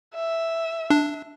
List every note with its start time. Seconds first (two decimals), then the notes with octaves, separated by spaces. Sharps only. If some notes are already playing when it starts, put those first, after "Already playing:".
0.14 E5
0.90 D4